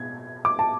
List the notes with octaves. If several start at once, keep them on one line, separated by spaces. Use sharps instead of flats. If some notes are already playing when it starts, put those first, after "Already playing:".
Already playing: B2 G#6
D6
A5